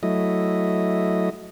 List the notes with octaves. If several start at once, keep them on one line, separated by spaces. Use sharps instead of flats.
F#3 A3 E4 D#5